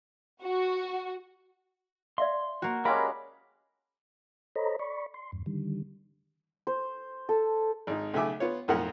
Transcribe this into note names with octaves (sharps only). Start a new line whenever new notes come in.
F#4
D5 E5 F5 C6
A#3 F#4
G3 G#3 C#4 A#4 F5 B5 D6
A4 C5 C#5 D#5 A#5 B5
D5 B5 C#6
C6
E2 G2
D3 D#3 G3
C5
A4
G#1 D#4
B1 C#3 A3 E5 G#5 D6
B3 F4 C#5
B1 F2 A2 A#4 F#5